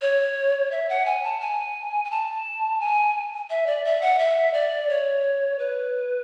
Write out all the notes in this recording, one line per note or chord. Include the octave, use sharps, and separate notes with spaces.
C#5
E5
F#5
G#5
A5
G#5
G#5
A5
G#5
E5
D5
E5
F#5
E5
D5
C#5
B4